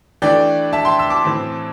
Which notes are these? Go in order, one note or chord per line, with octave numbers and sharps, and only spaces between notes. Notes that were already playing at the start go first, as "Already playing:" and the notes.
E3 A3 D4 D5 G5
E5 A5
G5 C6
E6
A5 D6
A2 E3 C4